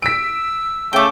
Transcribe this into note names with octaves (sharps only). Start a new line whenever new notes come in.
E6 B6 D7
C#3 A3 G5 D6